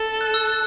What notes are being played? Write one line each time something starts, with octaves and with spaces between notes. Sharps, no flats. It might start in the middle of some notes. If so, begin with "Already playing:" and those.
Already playing: A4
F#6
E6
F#6